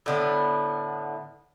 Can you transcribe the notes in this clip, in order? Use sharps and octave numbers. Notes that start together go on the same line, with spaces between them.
A2 D3 B3